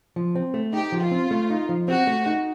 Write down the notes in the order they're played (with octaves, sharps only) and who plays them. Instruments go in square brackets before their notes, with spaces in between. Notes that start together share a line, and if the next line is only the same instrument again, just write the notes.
[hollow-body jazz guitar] F3
C4
A3
[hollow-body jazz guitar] D#4 [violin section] G4
[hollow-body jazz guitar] F3
[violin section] F4
[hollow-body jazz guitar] C4
A3
D#4
F3
[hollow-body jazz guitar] C4 [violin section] F#4
[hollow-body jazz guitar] A3
D#4